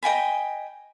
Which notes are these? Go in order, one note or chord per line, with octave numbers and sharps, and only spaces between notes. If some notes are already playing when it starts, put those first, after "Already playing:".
D#5 G5 G#5 B5